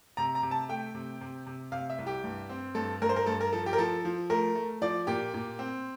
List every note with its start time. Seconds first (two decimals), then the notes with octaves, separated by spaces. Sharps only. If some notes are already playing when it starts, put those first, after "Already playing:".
0.17 C3 A#5
0.35 A#5
0.43 C3
0.51 A5
0.69 A3 G5
0.95 C3
1.21 C3
1.47 C3
1.72 C3 F5
1.90 E5
1.98 C2
2.07 G4
2.24 G2
2.49 C4
2.75 G2 A4
3.02 G2 A#4
3.09 C5
3.16 A#4
3.26 G2 A4
3.41 A#4
3.53 F3 A4
3.66 G4
3.73 A#4
3.78 F3 A4
4.05 F3
4.30 A3 A#4
4.55 A3
4.82 F3 D5
5.07 A#2 G4
5.34 A#2
5.59 C4